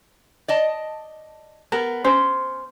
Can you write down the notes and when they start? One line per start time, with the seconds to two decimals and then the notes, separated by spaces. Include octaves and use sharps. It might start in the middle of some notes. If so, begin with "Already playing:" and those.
0.48 D5 D#5 A5
1.72 B3 A#4
2.04 C#4 C5